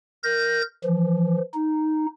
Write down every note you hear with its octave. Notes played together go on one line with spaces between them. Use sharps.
A#4 G6 A#6
E3 F3
D#4